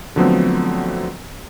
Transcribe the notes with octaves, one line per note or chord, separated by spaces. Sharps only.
D3 F3 F#3 A3 B3 C4